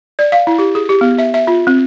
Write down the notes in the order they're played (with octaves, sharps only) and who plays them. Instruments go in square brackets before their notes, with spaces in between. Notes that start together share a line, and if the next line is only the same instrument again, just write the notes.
[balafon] D5
F5
E4
G4
G#4
G4
B3
E5
E5
F4
C4